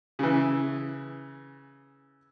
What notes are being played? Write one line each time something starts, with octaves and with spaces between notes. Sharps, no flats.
C#3 E3